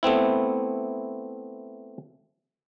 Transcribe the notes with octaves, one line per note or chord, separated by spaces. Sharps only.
A3 B3 C4 E4